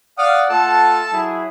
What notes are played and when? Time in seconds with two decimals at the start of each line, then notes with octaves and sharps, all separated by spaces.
0.18 D5 F5 F#5 D#6
0.50 A3 F4 A4 A5 E6
1.12 F#3 E4 G#4